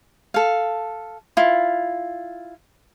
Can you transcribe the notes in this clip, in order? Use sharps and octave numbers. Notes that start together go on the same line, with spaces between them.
A4 F5
E4 F4